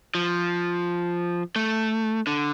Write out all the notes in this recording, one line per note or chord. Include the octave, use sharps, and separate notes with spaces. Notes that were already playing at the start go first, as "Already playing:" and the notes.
F3
A3
D3